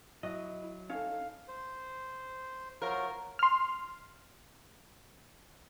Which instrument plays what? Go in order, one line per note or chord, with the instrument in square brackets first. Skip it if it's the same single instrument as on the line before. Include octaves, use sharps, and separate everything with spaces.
[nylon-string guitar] F#3 [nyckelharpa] E4 [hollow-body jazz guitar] D#5
[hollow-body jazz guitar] C#4 [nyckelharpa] D#4 A4 [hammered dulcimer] F5
[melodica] C5
[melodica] F#3 F4 C5 [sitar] A#4
[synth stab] C6 F6